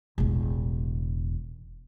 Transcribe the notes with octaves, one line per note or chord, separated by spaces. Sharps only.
E1 A1